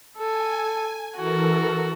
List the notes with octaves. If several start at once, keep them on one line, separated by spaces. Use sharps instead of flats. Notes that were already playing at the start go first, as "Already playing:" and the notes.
A4 G#5
E3 F#4 A4 A#4